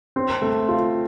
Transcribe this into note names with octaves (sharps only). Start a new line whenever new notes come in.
C4
A3
F4